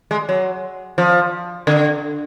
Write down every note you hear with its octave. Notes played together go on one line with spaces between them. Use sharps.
G#3
F#3
F3
D3